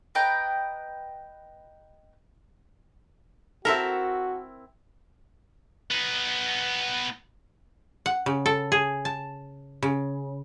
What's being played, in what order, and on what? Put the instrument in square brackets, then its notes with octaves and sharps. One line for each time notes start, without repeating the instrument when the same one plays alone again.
[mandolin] B4 D#5 G5 A#5
[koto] C4 E4 A#4 [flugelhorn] F#4 [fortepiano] A4 E5
[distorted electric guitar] B3 D#4
[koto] F#5
C#3
A4
G#4
A5
C#3